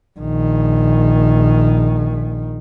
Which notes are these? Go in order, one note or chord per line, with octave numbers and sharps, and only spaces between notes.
A#1 D#3